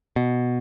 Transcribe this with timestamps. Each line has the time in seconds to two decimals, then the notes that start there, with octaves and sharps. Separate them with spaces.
0.16 B2